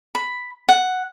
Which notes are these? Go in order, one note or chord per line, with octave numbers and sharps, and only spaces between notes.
B5
F#5